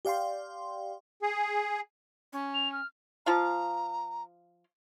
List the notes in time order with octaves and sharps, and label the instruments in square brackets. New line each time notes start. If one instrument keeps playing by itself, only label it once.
[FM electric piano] G4 D5 F5 G5 C6
[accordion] G#4
[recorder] C#4
[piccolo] F7
F6
[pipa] F3 F4 F5 [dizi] A#5